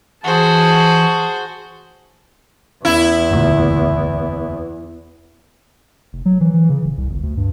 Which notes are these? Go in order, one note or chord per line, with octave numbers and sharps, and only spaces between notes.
E3 F#4 G#4 C5 A5
E2 E4
F#1 D2 A#2
F1
F#3
E3
E3
C#3
D#1
C2
G1
D2
G2